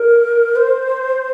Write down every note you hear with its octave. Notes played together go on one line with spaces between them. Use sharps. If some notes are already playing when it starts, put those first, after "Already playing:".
Already playing: A#4
C5